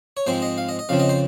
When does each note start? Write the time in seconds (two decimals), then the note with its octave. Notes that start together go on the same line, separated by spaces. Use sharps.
0.17 C#5
0.26 G#2 F3 G#3 C4 C5
0.42 D#5
0.58 F5
0.69 D#5
0.79 D#5
0.89 F2 C#3 F3 C4 F5
0.99 D#5
1.09 C5